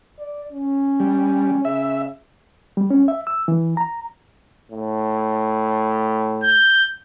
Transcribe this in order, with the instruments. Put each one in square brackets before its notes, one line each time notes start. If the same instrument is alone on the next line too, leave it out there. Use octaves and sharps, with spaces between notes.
[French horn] D5
C#4
[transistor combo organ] G3
[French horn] C#3 [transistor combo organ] E5
[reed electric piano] G3
C#4
E5
E6
E3
A#5
[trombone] A2
[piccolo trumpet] G6